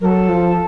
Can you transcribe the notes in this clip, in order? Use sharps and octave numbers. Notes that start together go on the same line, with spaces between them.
F#3 A4 A#4
F3